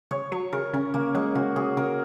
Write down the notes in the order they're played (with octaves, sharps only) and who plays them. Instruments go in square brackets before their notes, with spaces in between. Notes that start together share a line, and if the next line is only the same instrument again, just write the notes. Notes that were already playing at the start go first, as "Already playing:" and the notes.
[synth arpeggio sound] C#3 [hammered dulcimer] C#5
[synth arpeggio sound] F#3 [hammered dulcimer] C#5
[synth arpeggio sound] C#3 [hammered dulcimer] A#4
[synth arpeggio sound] C#3 [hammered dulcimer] C#4
[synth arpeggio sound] C#3 [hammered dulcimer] A#3
[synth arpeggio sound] F#3 [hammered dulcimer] G#3
[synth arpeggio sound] C#3 [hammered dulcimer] F#4
[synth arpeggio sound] C#3 [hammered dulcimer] G#4
[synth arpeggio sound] C#3 [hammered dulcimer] A#4